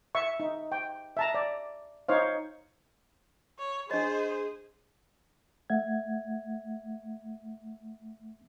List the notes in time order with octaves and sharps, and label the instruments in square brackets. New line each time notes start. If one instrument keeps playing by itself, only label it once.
[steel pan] E5 C#6
D#4
G5
E5 A5 A#5
D5
D#4 C5 C#5 F5
[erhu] C#5
[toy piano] D4 D#5 [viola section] G#4 [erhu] C5
[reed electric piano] A3 E5 F#5 G#6